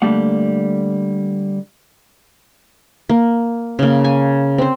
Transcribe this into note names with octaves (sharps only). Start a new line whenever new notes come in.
D3 G3 A3 A#3 F#5
A#3
C#3 A#3
G#5
C4 C5